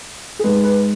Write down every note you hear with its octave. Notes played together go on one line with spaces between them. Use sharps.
G#4
G#2 G#3 B4
B4